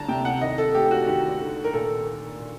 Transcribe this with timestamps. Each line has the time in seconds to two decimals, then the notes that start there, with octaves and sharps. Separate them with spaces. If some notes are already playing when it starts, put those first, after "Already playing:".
Already playing: D2 G3 A5 A#5
0.09 C3 G5
0.25 F#5
0.41 D#2 D#5
0.58 A4
0.74 A3 G4
0.85 G4
0.91 F#4
1.07 D#2 G4
1.40 D3
1.64 A#4
1.73 A#2 A4
2.06 A#3
2.39 A#2